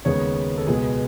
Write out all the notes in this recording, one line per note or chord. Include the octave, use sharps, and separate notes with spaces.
D#2 C#3 G#3 B3 C#5
A4
C#2 B2 G#3 B3 G#4